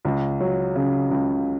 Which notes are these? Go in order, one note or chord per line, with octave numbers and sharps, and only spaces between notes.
C#2
F#3
C#3
C#2